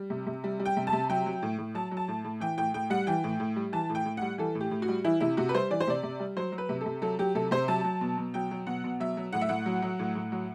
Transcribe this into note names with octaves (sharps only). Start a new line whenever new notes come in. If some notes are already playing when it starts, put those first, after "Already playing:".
Already playing: G3
C3
C3
G3
G3
G5
C3
A5
C3
F#3 G5
F#3
A2
A2
F#3 A5
F#3
A5
A2
A2
E3 G5
A2 G5
A2 G5
G3 F#5
E3 G5
A2
A2
G3
E3 A5
A2
G5
A2
G3 F#5
E3 A4
A2
G4
A2
F#4
G3
E3 E4
C3 E4
C3 F#4
B4
G3 C5
E3 D5
C5
C3 D5
C3
G3
F#3 C5
F#3
B4
C3
C3 A4
F#3 A4
F#3 G4
C3 A4
C3 C5
F#3 A5
F#3
B2
B2
F#3 G5
F#3
B2 F#5
B2
F#3 E5
F#3
A2 F#5
E5
A2 F#5
F#3
F#3
A2
A2
F#3